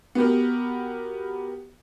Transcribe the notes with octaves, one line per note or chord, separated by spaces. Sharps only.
B3 F#4 G4 A#4